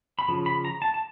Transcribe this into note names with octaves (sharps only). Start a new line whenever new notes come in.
B5
C#3 F3
B5
A#5
A5
A5